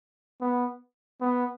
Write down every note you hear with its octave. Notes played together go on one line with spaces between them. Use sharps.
B3
B3